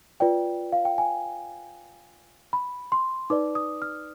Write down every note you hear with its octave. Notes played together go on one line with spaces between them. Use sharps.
F4 B4 D5 G5
F5
G5
G#5
B5
C6
D#4 B4 D5 D6
D#6
F6